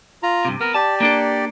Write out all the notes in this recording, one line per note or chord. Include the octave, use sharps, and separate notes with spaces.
F4 A#5
G2 C3
B3 A#4
G4 D5 A5
A#3 D4 A4